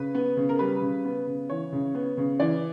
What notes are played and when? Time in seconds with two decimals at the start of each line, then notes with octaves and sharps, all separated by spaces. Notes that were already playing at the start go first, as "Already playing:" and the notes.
Already playing: C#3 B4
0.14 B3
0.37 C#3
0.49 A#4
0.59 G3 B4
0.82 C#3
1.05 B3
1.27 C#3
1.49 E3 C#5
1.72 C#3
1.95 B3
2.17 C#3
2.40 E3 D5